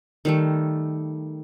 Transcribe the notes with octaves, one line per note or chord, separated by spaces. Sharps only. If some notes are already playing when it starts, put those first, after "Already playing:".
D#3 G3 A3